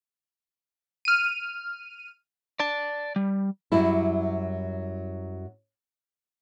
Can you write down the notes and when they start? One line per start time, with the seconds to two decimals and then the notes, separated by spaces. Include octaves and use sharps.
1.05 F6 D#7
2.60 D5 A5
3.16 G3
3.72 F#2 F#3 G3 E4